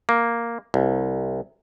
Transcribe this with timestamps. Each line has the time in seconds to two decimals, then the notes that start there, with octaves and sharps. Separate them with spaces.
0.09 A#3
0.74 C2